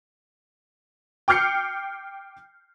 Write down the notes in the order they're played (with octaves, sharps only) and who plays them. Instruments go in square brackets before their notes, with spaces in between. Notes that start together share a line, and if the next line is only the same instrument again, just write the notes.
[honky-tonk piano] G5 D6 F6 G6 C7 C#7